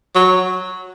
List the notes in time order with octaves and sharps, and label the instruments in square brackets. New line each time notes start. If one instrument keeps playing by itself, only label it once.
[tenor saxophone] F#3